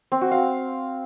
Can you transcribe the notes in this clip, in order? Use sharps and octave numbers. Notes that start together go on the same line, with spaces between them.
C4
F#4
F5